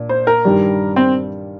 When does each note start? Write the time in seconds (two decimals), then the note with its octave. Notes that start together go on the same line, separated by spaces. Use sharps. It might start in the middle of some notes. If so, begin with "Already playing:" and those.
Already playing: A#2 D4
0.09 C5
0.27 A#4
0.45 G2 D#3 G3
0.96 C4